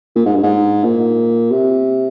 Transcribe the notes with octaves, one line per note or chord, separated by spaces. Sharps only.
A#2
G#2
G2
G#2
A#2
C3